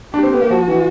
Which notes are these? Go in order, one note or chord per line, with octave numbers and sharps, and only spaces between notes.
D4 G4
C4
B3
A#3
F3 F#4
E3